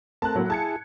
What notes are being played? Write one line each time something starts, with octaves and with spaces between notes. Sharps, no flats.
A3 C4 A#4 A5 F#6
A2 F#3 A#3
E4 G#4 A5 G#6 C#7